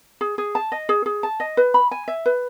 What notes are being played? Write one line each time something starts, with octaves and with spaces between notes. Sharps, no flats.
G#4
G#4
A5
D#5
G#4
G#4
A5
D#5
B4
B5
G#5
E5
B4